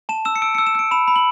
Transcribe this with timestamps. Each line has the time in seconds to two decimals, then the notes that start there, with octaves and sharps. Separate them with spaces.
0.09 A5 E7
0.25 E6 E7
0.36 C#7
0.42 E6 D7
0.55 E6 C#7
0.67 E7
0.75 E6 D7
0.91 B5 E7
1.08 B5
1.16 F#7